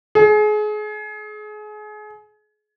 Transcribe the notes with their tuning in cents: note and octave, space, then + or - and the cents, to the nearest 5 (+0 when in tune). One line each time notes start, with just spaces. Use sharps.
G#4 +30